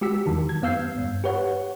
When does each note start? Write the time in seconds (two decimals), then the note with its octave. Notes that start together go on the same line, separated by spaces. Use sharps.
0.01 G#3 F#4 G4 E6 B6
0.26 E2 D#3 F#3
0.49 G#6
0.62 F#2 B3 F5 E6 G6 C7
0.98 G2
1.24 G4 B4 C#5 F#5